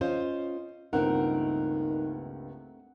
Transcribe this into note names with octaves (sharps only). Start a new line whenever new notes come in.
C#4 F4 C5 D#5
C#2 G2 D#3 A3 A#3 C4 A#4 F#5